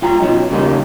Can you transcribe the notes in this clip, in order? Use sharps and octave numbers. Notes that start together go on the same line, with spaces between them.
F4 G5 A#5
F#2 B2 F#3 D#4
C#3 G3 A#3 D#4